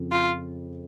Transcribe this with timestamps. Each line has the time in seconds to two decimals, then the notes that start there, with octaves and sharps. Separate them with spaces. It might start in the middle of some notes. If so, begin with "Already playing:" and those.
Already playing: F2 C#3
0.12 F4